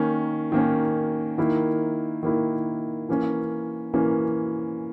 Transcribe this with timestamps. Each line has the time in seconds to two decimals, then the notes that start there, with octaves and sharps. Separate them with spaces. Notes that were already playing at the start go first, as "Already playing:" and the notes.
Already playing: D#3 A#3 C#4
0.52 D#3 A#3 C#4
1.38 D#3 A#3 E4
2.23 D#3 A#3 E4
3.09 E3 A#3 C#4
3.94 E3 A#3 C#4